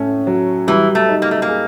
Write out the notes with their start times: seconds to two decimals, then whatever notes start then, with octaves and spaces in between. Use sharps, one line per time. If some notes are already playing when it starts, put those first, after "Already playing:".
Already playing: A2 A3 C#4
0.27 F#3
0.68 E3 G3
0.95 A3
1.09 D#4
1.22 A#3
1.31 A3
1.42 A#3
1.48 G#4